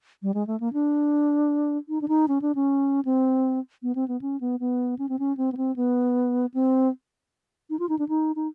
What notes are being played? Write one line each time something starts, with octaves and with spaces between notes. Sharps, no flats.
G3
G#3
A3
A#3
D4
D#4
D4
D#4
C#4
D4
C#4
C4
B3
C4
B3
C#4
B3
B3
C#4
C4
C#4
C4
B3
C4
B3
C4
D#4
F4
D#4
D4
D#4
D#4